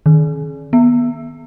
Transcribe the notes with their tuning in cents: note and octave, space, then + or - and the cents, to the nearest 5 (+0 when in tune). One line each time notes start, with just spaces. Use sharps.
D#3 -15
B3 -25